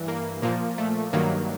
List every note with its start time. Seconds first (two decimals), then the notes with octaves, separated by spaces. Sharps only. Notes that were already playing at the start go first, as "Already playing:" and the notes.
Already playing: G2 E3
0.08 A#3
0.42 A#2 F3 A#3
0.78 A3
1.13 G2 D#3 F#3 A#3